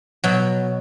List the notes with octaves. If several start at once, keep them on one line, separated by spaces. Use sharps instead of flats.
B2 F#3